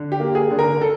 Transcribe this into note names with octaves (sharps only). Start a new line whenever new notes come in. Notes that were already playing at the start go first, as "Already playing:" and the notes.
Already playing: D3
G4
A#3
G#4
D3
A#4
A4